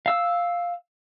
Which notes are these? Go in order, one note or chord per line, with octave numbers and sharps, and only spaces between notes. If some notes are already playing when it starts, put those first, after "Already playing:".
F5 E6